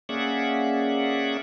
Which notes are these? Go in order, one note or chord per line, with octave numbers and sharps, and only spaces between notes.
A#3 C#4 G#4 D5 E5 F#5